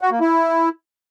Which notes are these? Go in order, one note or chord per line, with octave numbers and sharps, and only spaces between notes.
F#4
A#3
E4